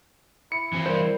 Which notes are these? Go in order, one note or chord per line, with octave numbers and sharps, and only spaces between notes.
E4 C#7
E3 C4
G3 A#4 C5 D5